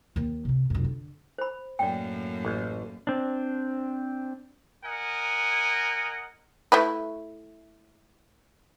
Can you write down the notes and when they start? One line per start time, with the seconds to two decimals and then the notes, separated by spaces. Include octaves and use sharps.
0.16 D#2 D#3
0.45 C3 C#4
0.70 F1 F#2
0.84 D3
1.38 C5 B5
1.79 F#2 A2 A#3 D5 G5
2.45 A1
3.07 C4 D4
4.84 A#4 D#5 F#5 G#5
6.72 A3 E4 B4